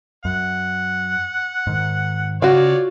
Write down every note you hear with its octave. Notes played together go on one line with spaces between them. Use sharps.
F#2 F#5
G#2 D#3
C#3 F4 F#4 C#5 D5